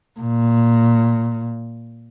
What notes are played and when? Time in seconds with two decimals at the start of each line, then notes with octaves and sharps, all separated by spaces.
0.20 A#2